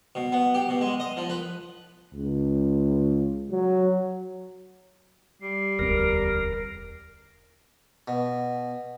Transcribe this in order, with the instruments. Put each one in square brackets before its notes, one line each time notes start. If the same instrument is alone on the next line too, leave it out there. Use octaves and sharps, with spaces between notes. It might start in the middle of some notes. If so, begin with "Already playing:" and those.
[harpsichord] B2
B3
G4
B2
G#3
D#5
F3
B4
[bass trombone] C#2
F#3
[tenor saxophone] G3 [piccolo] C7
[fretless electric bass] E1 D2 C4 [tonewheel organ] A#4
[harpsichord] B2